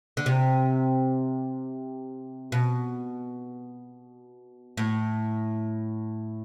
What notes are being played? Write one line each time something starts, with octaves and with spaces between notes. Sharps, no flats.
D3
C3
B2
A2